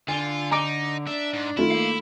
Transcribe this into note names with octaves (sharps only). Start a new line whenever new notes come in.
D3 F4 G#5
D#4 A#5 D6 D7
D4 E5
G#2
D#3 A3 E4 F4
A#3 F5